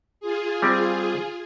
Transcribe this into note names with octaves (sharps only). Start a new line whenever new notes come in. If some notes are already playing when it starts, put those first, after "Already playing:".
F4 G#4
G3 C4 G4